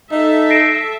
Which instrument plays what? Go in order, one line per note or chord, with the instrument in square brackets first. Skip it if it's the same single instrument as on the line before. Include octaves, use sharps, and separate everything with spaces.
[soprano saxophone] D#4 [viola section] A4 E5
[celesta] A#6 C7 D7